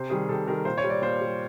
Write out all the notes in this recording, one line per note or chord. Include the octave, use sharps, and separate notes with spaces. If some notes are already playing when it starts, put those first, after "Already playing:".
Already playing: C3 C5
D#3 G3 G#4
C3 A4
D#3 G3 A#4
A#2 C5
C#5
G3
D5
A#2 C5
G3